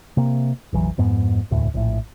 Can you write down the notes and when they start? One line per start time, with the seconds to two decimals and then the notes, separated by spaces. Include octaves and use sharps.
0.17 C3 A#3
0.73 F1 A#1 E3 F#3
0.98 F2 G#2 B3
1.51 E1 D2 A2
1.74 A#1 A2